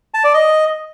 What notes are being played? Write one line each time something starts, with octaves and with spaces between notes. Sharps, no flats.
A5
D5
D#5